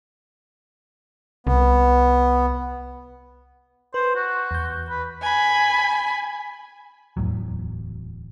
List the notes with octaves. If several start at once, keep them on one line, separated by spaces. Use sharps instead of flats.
C2 B3
B4 C5
F#4
E2 G6
B4
G#5 B5
D1 E2 A2 F#3